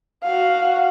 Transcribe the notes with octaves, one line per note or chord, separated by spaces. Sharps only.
F#4 F5